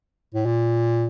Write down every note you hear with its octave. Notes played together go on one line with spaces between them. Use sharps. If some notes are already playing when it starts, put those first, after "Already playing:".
A2
A#2